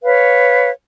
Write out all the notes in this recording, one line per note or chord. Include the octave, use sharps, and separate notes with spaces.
B4 C#5 F5